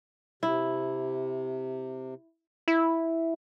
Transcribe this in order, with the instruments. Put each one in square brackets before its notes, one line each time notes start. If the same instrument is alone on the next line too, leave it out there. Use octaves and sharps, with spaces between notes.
[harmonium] C3 [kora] E4
[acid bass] E4